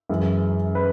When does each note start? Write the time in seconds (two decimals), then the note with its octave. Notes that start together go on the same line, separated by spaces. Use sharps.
0.09 F#2 E3 G#3
0.75 B4